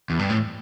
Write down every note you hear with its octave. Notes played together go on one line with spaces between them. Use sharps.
E2
G2
A2